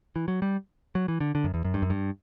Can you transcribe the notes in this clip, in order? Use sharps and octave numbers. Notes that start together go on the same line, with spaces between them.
E3
F#3
G3
F#3
E3
D3
D3
F#2
E2
F#2
G2
F#2
G2